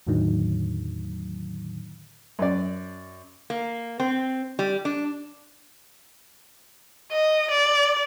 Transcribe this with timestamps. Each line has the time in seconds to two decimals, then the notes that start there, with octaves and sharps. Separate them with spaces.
0.07 E2 A2 D3 D#3 F#3
2.39 F#2 D5
3.50 A#3
4.00 C4
4.59 G3
4.85 D4
7.12 D#5
7.50 D5